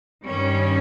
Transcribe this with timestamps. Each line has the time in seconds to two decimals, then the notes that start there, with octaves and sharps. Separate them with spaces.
0.24 G2 D#3 G3 C#4